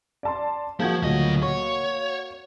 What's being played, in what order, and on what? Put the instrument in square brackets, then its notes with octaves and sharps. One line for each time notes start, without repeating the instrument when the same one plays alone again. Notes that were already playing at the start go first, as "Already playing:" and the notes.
[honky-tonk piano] D5 A5 C6
[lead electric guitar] F3 [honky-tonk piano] A#3 F#4 [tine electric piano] G#4 G6 G#6
[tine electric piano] D2 A#2 F#3 [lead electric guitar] C#3 D#5
[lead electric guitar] C#5 [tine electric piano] C#6